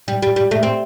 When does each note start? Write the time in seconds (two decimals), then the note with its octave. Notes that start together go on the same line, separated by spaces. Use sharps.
0.08 G3
0.22 G3
0.36 G3
0.51 A3
0.63 C4